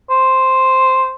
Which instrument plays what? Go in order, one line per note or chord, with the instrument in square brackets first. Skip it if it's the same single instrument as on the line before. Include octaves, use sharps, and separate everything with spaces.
[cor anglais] C5